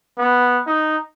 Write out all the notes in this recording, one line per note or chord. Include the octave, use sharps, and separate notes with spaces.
B3
D#4